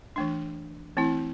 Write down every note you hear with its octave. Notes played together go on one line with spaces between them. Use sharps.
E3 A3 D4
E3 A3 C4 E4